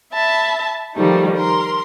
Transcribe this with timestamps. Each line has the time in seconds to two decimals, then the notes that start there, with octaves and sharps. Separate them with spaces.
0.12 E5 A5 B5
0.95 D#3 F3 G3 A3 D#4
1.36 A#4 C6